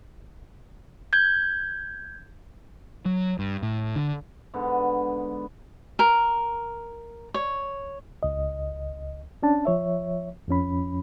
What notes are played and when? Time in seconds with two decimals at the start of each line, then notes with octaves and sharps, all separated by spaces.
1.13 G6 G#6
3.06 F#3
3.39 G2
3.63 A2
3.96 D3
4.54 G#2 D3 B3
5.99 A#4
7.34 C#5
8.23 C#2 D#5
9.43 C#4 D4 A5
9.65 F3 C#5 E5
10.48 F2 F3 C#4 B5